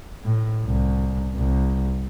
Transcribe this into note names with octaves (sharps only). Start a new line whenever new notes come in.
A2
C2
C2